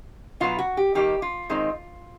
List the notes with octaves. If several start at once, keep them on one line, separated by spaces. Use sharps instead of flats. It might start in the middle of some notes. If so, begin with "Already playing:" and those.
B2 F#3 B3 F4
F#4
G4
D#3 G3 A#3 D#4 G4
F4
D#3 G#3 C4 D#4